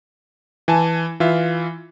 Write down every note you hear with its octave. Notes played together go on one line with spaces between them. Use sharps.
E3 G#5 A5
E3 F4 E5